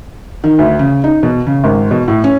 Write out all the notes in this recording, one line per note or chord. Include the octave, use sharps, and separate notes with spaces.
D#3
D2
C#3
D#4
B2
C#3
G#1
B2
A2
C#4